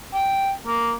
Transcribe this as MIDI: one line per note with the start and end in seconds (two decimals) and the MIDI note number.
0.14 0.51 79
0.66 0.92 58